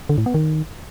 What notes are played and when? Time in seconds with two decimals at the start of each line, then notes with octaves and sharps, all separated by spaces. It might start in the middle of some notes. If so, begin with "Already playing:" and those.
0.09 D3
0.18 A2
0.26 B3
0.34 D#3